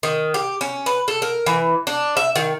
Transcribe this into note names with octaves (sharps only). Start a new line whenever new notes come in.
D#3
G4
C#4
B4
A4
A#4
E3
D4
E5
D#3